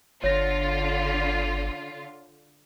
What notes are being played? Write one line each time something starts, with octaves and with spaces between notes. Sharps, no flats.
G1 D3 F4 C#5 A#6